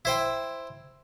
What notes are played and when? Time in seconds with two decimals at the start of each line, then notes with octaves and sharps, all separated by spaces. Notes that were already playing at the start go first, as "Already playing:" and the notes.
0.05 E4 C5 G5